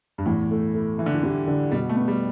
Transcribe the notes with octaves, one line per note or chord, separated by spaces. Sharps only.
G2
E2 A2
A3
A3
E3 E4
D3
E3
G3
D3
B2 G3
A3
B3
G3